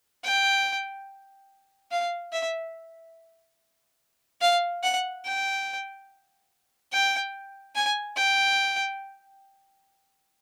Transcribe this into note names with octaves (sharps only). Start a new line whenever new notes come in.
G5
F5
E5
F5
F#5
G5
G5
G#5
G5